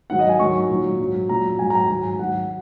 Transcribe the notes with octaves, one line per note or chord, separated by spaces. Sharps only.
G#2 D#3 F#3 F#5
D#5
G#5
G#2 D#3 F#3 C#6
A#2 F#3
G#2 F#3
A#2 F#3 A#5
G#2 F#3 G#5
A#5
G#5
G#2 D#3 F#3
G#2 F#3 F#5